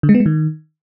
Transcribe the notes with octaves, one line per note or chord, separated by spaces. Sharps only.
D3
G#3
B3
G#3
D#3